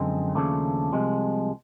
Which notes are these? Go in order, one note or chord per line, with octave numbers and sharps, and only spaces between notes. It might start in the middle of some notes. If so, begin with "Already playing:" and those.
Already playing: F#2 D3 F3 G#3 C4
D#2 C#3 F3 A3 D4
C2 C3 F3 G#3